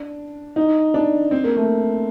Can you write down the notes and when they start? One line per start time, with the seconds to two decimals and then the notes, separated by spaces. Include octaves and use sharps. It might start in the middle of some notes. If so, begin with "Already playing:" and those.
Already playing: D4
0.56 D#4
0.94 D4
1.31 C4
1.44 A#3
1.56 A3